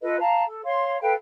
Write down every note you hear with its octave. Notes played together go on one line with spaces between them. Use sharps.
F4 A4 B4 D#5
F5 A5 A#5
A4
C#5 F5 C6
A4 B4 F5 G5